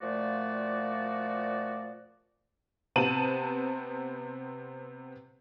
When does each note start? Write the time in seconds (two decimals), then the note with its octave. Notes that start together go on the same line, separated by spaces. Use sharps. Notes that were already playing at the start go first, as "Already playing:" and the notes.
0.02 A#2 F3 A3 F#4 D5
2.96 C3 B3 C4 A5 D#7 F#7